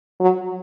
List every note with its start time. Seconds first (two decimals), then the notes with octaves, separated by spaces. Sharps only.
0.21 F#3